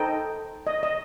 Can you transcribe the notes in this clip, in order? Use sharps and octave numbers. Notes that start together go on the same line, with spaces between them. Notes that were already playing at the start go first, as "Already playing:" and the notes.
Already playing: D#4 A4 C5 D#5 G5
D#5
D#5